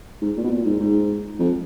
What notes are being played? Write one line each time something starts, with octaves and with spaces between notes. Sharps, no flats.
G#2
A#2
B2
A#2
G#2
G#2
F2